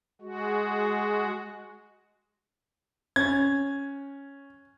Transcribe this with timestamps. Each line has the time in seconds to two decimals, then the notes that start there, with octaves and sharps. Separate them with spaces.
0.21 G#3 F#4
3.16 C#4 G#6